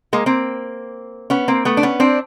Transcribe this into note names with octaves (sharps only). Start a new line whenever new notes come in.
G#3 A#3
A#3 C4
B3 C#4
A#3 C4
A3 B3
D4
B3 C#4
C4 D4